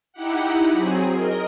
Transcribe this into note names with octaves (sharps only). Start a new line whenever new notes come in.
D#4 E4 G4 F#5
F#3 C4 G#4
A#4 D#5